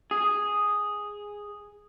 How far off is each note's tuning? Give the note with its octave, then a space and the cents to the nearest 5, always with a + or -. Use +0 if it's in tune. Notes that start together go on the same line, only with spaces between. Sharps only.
G#4 -5